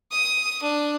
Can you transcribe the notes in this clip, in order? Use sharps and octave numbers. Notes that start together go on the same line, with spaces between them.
D#6
D4